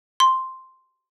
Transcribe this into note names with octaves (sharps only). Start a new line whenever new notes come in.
C6